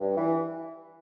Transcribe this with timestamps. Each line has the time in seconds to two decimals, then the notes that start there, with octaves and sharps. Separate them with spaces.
0.01 G2
0.17 E3